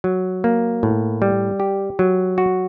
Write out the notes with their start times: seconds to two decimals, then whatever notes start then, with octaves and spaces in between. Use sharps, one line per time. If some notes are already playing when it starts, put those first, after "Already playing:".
0.04 F#3
0.44 A#3
0.83 A2
1.22 G3
1.60 G4
1.99 F#3
2.38 F#4